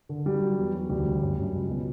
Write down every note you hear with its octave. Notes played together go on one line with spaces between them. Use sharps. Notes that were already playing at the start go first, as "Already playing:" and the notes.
D3
F#3 G3
F#3
E2
F#3
D2 G3
D2
F#2
F#2
C#2
B2